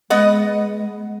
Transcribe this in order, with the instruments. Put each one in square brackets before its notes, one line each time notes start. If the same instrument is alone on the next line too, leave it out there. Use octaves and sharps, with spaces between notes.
[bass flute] G#3 [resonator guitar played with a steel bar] B3 D#5 F#5